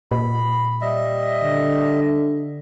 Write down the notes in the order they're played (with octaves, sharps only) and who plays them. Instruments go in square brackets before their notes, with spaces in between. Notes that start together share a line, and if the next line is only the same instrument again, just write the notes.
[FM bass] A#2 [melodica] B5
[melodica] G3 D#5 E5
[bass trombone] D3